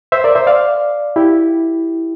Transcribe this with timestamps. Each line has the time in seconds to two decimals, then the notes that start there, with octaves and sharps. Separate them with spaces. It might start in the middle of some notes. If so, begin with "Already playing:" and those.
0.12 C5 E5
0.24 A#4 D5
0.35 C5 E5
0.47 D5 F5
1.16 E4 G4